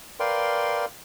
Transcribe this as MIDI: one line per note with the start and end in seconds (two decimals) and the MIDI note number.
0.20 0.85 70
0.20 0.85 71
0.20 0.85 74
0.20 0.85 77
0.20 0.85 79
0.20 0.85 84